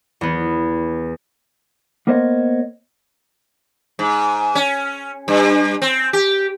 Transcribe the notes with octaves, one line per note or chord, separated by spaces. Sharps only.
E2 B3
A#3 B3 A#4 C5 C#5 D#5
G#2
C#4
G2
C4
G4